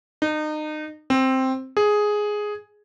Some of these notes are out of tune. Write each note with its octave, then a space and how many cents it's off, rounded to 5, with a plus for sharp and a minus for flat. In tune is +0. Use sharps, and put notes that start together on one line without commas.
D#4 -30
C4 +5
G#4 +5